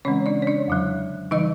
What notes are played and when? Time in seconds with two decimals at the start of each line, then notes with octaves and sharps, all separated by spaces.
0.05 C#3 E3 G#3 C4 C#4 C#5
0.26 D4 D5
0.42 C#5
0.47 D4 D5
0.68 F2 D3 F#3
1.31 C#3 E3 G3 D#4 D#5